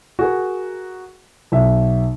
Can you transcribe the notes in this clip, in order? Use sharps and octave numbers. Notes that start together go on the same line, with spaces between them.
F#4 G#4 A#4
B1 E5